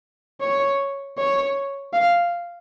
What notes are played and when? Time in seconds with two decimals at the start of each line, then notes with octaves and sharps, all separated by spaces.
0.41 C#5
1.18 C#5
1.93 F5